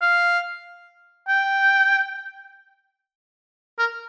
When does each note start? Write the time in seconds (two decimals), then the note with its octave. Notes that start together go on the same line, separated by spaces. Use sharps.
0.02 F5
1.28 G5
3.79 A#4